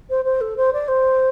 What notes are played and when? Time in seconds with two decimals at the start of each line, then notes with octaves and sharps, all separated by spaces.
0.10 C5
0.25 C5
0.41 A4
0.57 C5
0.73 D5
0.88 C5